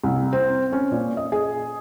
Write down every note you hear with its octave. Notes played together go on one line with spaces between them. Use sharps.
C2
C4
C#4
A#2
D#5
G#4